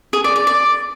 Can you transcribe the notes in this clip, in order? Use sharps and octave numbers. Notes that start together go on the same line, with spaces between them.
G#4
D5
D5
D5